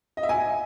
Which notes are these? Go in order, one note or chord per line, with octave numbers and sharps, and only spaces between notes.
D#5
E5
G#5